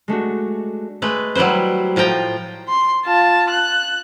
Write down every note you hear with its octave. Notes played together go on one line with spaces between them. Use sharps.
G#3 A3 D4 F#4
G#3 A3 B4
F#3 G3 E4 B4 C5
A2 F3 F4 G5 A#5
C6
F4 A5
F#6